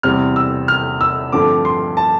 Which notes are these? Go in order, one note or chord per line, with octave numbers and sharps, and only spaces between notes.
E2 C3 G3 C4 F6
E6
F6
E6
G2 D3 F3 A3 C4 D6
C6
A5